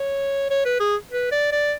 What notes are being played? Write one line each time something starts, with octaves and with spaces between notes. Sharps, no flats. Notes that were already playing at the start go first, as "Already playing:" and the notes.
Already playing: C#5
C#5
B4
G#4
B4
D5
D5